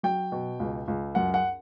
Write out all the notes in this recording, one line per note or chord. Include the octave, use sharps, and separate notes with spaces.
F#3 G5
B2
C#2
C#2
F#2 F#5
F#5